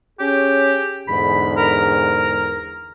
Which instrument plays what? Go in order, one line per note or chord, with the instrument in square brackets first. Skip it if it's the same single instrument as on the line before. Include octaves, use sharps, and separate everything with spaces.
[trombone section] C#4 G#4 [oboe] G4
[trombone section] E2 G#2 D3 [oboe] B5
[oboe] A#4